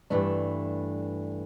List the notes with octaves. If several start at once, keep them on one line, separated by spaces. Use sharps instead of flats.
G2 E3 A3 D4